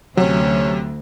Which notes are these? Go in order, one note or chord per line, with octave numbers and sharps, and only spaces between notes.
D2 C3 F#3 C#4